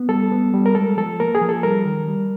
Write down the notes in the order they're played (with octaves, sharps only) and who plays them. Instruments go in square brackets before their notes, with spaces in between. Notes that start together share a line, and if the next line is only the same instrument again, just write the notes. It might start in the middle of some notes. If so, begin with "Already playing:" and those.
Already playing: [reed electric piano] B3
G3 A4
B3
G3
A#4
G#3 A4
F3 A4
A#3 A#4
G#4
F3
A4
G3 A#4
D#3
G3